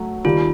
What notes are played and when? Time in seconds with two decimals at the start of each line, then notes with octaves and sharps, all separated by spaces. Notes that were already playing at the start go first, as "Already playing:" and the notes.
Already playing: F#3 A3
0.25 D#2 D#3 G3 F4